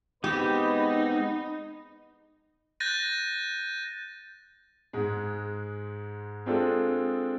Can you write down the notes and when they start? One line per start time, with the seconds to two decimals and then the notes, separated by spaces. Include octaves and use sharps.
0.24 G#3 B3 C4 D#4 G4 B4
2.80 F#6 G6 A6 A#6 D#7
4.93 G#2 G#3
6.46 G#3 C4 D4 F4 G#4 A4